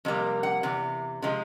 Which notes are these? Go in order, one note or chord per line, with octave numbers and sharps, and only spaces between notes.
F2 C3 G3 A#3
F#5
E2 C3
C3 F3 G#3